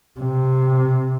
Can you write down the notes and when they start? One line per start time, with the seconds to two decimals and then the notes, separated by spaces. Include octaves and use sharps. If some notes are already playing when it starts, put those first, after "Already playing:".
0.20 C3